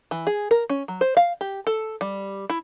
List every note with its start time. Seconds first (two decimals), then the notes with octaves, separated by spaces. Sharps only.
0.11 E3
0.27 G#4
0.51 A#4
0.70 C#4
0.88 F#3
1.01 C5
1.17 F5
1.41 G4
1.67 A4
2.01 G3
2.50 E4